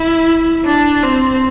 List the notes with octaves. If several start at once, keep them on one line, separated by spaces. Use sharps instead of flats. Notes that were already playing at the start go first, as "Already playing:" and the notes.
Already playing: E4
D4
C4